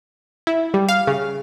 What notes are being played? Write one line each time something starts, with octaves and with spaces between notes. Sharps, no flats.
E4
G3
F5
C#3